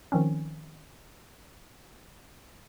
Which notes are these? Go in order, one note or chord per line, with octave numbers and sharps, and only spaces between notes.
D#3 F3 C4 C#4